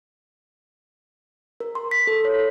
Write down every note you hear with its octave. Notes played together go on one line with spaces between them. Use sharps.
A#4
C6
B6
A4
C#5